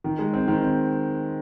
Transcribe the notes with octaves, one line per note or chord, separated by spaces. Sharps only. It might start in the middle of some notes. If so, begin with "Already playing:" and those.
D#3
G#3
C4
D#3
C4